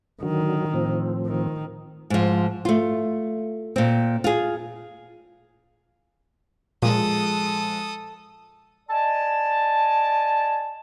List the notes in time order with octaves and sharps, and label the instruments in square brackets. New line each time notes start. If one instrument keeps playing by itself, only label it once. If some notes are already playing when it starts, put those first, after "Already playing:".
[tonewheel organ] D3 F#3 [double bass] D#3
[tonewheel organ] A2 F3 C4
[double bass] D#3
[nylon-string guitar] G#2 F3
A3 F4
A#2 C4
F4 G#4
[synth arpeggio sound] A#2 [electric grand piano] F3 G#3 [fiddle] A4 D#6
[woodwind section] D5 D#5 G#5 A5